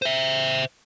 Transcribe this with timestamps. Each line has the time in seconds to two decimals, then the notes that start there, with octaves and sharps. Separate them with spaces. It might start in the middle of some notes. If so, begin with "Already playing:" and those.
0.02 C5 E5